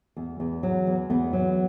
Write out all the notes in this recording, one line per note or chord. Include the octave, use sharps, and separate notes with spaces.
E2
E2
F#3
E2
E2 B3
F#3